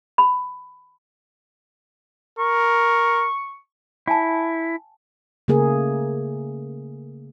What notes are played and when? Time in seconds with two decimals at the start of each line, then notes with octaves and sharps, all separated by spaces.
0.18 B5
2.39 A#4 C#6
4.08 E4 F#5 G#5 A5
5.48 C#3 A3 A#3 G#4 A#4